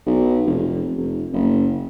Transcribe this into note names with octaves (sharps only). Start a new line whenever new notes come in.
B1
F1
F1
F#1